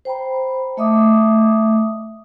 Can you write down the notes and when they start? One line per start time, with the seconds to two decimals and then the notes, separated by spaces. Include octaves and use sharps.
0.05 C5 G5 A#5 B5
0.77 A3 D#5 E5 D6 D#6